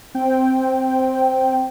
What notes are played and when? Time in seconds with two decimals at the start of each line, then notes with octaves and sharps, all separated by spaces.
0.15 C4 G5